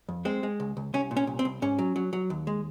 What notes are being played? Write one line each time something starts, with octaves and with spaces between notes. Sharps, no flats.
F2
G#3 C4
G#3
C#2
C#2
C2 C#4
A#2
C#4
C2
C4
C2
G#2 C#4
F#3
F#3
F#3
D#2
G#3